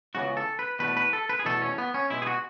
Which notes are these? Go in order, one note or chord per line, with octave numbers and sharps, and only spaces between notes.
C#2 C#3 E3 B3 F#4
A4
B4
E2 B2 A3 B4
B4
A4
B4
G#4
E2 B2 A3 A4
C#4
B3
C#4
B2 G#3 B3 E4
G#4
F#4